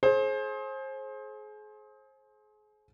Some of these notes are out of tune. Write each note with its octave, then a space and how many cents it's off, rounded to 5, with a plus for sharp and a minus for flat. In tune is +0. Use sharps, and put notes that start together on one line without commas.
G#4 +35 C5 +30